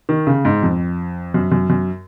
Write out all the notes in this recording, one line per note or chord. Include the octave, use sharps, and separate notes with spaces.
D#3
C#3
G#2
F2
F#2
F#2
F#2